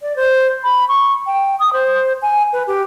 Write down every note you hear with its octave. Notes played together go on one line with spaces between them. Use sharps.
D5
C5
B5
C#6
G5
D#6
C5
G#5
B4
G4